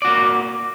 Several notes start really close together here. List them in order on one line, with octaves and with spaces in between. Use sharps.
D5 F#4 A#3